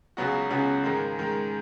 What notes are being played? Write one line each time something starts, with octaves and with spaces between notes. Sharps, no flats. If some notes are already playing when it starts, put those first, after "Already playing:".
C#2 C#3 F#3 B3 F#4
C#2 C#3 F#3 B3 F#4
G#2 D#3 G#3
G#2 D#3 G#3